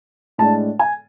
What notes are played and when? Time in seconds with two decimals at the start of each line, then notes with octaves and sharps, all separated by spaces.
0.38 A2 G#3 D4 A5
0.79 G#5